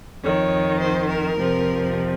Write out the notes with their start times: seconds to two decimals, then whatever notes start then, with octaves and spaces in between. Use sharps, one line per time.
0.22 F2 D#3 C#5
0.79 C5
1.08 A#4
1.36 F2 C3 F3